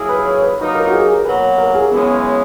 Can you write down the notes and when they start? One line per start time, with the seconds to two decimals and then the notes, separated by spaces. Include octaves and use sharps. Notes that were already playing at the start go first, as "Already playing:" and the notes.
Already playing: F#3 A#3 E4 G#4
0.09 B4
0.25 C#5
0.42 B4
0.59 F#3 A#3 D#4 B4
0.75 A#4
0.87 F#4
0.92 G#4
1.03 G#4
1.14 A#4
1.25 B2 F#3 A#3 B4
1.58 A#4
1.75 G#4
1.91 F#2 C#3 E3 G#3 B3 C#4